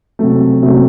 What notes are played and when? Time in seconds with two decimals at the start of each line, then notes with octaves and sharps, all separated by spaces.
0.19 C3 F#3 A3
0.62 C3 F#3 A3